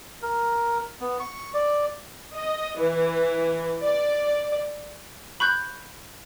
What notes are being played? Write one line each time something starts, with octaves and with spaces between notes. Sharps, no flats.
A#4
B3
C#6
D5
D#5
E3
D5
B5 C#6 F#6 G6